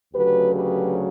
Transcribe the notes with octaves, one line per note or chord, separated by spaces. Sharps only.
D2 C#3 F#3 G4 B4
G4 B4